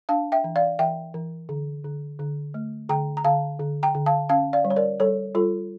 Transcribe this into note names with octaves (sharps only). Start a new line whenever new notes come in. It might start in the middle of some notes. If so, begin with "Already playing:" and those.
D4 F5 A5
E5 G5
E3
D5 F5
E3 E5 G5
E3
D3
D3
D3
A3
D3 G5 A#5
A#5
D3 F5 A5
D3
G5 A#5
D3
F5 A5
C#4 F5 A5
D5 F5
G3
C#5
A#4 D5
G3 A4 C#5
G3 F4 A4